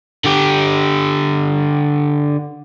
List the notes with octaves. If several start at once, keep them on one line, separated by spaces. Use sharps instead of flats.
D3 G4